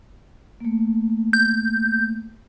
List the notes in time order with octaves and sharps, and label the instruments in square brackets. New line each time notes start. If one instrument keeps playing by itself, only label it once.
[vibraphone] A3 A#3
[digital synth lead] G6